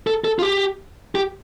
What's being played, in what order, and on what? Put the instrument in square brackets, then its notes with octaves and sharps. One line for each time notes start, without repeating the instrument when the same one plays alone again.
[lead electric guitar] A4
A4
F4
G4
G4